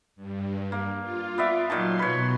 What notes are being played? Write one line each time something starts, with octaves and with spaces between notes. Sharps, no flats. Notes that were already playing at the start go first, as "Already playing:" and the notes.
G2
A#3
F4
B3 D5 E5
A#2 D#3 F#3 A5 C6
B2 B4 C#5